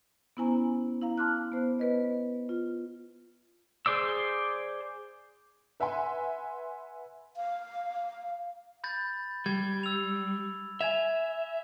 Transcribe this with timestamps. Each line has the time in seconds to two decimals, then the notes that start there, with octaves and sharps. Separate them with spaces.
0.37 B3 C#4 E4 C5 G#5 A#5
1.02 E4 F5 A#5
1.18 A5 C6 D6 F6 F#6
1.52 B3 C5
1.79 B3 B4 D#5
2.49 F4
3.86 G#4 C5 D5 E6
5.80 B4 E5 F#5 G#5 C6
7.37 F5
8.84 B5 G6 A6
9.46 G3 G#6
9.83 E6 F7
10.81 E5 G#5 G#6 F7